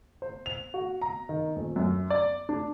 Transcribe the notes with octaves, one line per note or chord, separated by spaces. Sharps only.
C5
F7
F#4
A#5
D#3
D#1
F#2
D5
D4